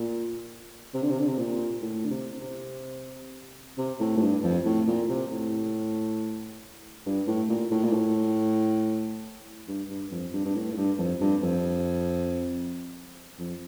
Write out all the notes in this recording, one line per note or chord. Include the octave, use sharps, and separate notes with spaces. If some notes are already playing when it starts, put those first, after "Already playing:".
Already playing: A#2
C3
D3
C3
D3
C3
A#2
A2
D3
C3
C3
C3
A2
A2
G2
F2
A2
A#2
C3
A2
G2
A2
A#2
A2
A#2
A2
G2
G2
F2
G2
G2
A2
A2
G2
F2
G2
F2
F2